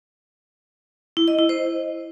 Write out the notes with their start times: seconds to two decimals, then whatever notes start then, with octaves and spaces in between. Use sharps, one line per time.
1.17 E4
1.28 D#5
1.38 E4
1.49 C5